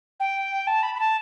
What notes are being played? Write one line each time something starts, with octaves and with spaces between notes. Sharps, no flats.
G5
A5
B5
B5
A5